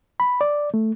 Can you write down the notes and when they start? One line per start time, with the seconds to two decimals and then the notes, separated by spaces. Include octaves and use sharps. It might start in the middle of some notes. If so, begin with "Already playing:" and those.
0.20 B5
0.41 D5
0.74 A3